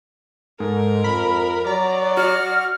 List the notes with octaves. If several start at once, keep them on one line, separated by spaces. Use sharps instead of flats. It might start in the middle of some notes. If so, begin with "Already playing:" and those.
G#2 A4 A#4
F2 B5
F#3 D5 A#5
F#4 F6